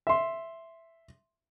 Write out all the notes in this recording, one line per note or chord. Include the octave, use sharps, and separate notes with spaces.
E5 C6